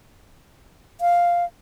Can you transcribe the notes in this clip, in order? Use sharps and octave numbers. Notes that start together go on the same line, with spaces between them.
F5